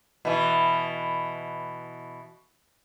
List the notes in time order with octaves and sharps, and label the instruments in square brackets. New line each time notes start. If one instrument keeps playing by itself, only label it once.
[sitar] B2 E3